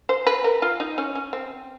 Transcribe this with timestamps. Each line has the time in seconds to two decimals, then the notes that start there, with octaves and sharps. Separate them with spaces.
0.09 C5
0.27 B4
0.44 A#4
0.62 F4
0.80 D#4
0.98 C#4
1.15 C#4
1.33 C4